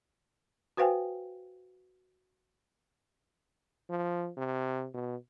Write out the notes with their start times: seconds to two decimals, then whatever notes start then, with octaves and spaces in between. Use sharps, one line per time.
0.77 F#4 B4 C5 F5 G5 G#5
3.90 F3
4.37 C3
4.94 B2